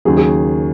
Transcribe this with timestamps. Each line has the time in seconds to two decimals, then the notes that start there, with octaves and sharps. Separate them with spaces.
0.05 D#2 C#3 F#3 G#4
0.17 G#4